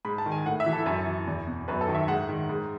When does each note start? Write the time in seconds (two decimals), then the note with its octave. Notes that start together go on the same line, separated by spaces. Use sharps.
0.05 G#2 B5
0.18 A5
0.26 D#3
0.32 G#5
0.46 A2 F#5
0.60 E5
0.66 E3
0.73 A4
0.86 F#2
1.06 E3
1.27 E2
1.47 B2
1.68 F#2 B4
1.81 A4
1.88 D#3
1.95 E5
2.08 G#2 F#5
2.29 D#3
2.49 G#2